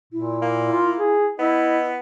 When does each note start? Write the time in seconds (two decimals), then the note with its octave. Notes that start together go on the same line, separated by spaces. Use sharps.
0.13 A#2 E4
0.42 A#3
0.72 F4
0.99 G#4
1.39 B3 E4 D#5